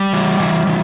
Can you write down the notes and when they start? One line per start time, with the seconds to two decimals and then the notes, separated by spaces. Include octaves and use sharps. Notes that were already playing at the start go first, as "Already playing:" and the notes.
Already playing: G3
0.13 E3
0.40 E3
0.67 E3